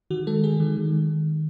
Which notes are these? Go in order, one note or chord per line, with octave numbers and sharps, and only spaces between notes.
D#3 F#4
G#3 A4
G#3 G#4
D#3
D#3